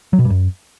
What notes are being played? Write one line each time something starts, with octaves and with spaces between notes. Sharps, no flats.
F#3
B2
G2
F#2